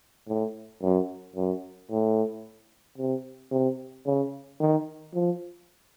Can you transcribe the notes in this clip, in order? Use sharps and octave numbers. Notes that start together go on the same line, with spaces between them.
A2
F#2
F#2
A2
C3
C3
C#3
D#3
F3